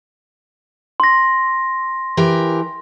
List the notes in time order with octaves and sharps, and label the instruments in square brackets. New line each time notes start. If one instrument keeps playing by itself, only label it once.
[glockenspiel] C6 A#6
[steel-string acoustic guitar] E3 G4 A#4